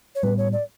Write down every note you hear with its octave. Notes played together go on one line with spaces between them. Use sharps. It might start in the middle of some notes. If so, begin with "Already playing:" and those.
C#5
A2 G3 B3 B4
C#5
D5